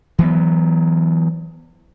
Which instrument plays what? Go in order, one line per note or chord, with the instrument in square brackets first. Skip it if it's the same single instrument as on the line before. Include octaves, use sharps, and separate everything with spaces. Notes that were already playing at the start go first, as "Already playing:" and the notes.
[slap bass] E3 F#3 B3